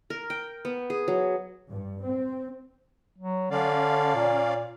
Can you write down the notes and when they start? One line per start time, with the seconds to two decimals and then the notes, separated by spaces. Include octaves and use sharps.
0.10 A#4
0.30 G5
0.65 B3
0.90 G#4
1.08 F#3
1.71 G2
2.05 C4
3.18 F#3
3.51 D3 C#4 D5 F5
4.15 A#2